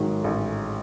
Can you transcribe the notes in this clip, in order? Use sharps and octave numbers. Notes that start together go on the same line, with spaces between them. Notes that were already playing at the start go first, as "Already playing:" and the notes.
Already playing: A1 G#2 D#3 F#3
A1